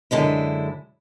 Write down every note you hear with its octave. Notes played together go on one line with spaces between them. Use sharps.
F#2 D3 G#3 E4